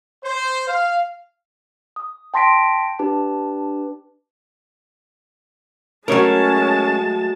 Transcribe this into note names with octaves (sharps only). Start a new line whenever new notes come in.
C5
F5
D#6
G5 A5 C6 A#6 B6 D7
D4 G4 B4 A5
F#3 G#3 A3 C#4 A#4 C#5 A5